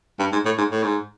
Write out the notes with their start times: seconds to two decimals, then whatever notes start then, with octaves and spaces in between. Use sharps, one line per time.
0.19 G2
0.32 G#2
0.45 A2
0.58 G#2
0.71 A2
0.83 G#2